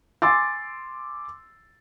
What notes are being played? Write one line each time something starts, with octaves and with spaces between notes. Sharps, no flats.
G#5 C6 D6 E6 A6